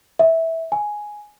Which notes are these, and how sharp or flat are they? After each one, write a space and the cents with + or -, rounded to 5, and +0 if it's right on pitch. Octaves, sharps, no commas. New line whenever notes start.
E5 -15
G#5 +5